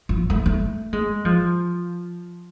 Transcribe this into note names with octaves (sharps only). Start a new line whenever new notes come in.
F3
A3
A3
G#3
F3